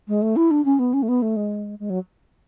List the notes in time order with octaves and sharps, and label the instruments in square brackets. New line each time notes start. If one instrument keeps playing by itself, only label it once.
[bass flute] G#3
A3
E4
D4
C#4
B3
C#4
A3
B3
A3
G#3
G#3
F#3